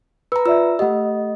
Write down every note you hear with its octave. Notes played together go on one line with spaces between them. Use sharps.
B4 A#5 E6
F4 D5 E5 E6
A3 G4 D#5 F#5